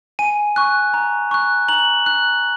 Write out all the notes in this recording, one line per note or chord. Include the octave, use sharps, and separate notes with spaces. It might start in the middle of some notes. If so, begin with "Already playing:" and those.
G#5 D#7
C#6 F#6
A#5
C#6 F#6
A#5 F#7
F#6